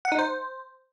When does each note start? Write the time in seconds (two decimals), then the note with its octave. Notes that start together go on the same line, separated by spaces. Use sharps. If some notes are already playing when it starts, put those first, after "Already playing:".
0.05 F#5
0.12 D#4
0.19 C5